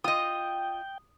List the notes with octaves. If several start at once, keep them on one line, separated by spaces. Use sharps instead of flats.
F4 D#5 G5 D#6